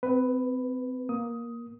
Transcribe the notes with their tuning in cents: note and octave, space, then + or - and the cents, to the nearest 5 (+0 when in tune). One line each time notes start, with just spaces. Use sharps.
C4 -35 B4 +10
A#3 +15 D#6 +15